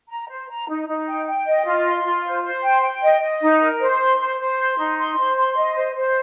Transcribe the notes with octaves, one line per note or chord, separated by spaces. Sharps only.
A#5
C5
A#5
D#4
D#4
G5
G5
D#5
F4
C6
F4
C5
C5
G5
G5
D#5
D#5
D#4
A#4
C5
C6
C5
C5
C6
D#4
C6
C5
C6
D#5
C5
C5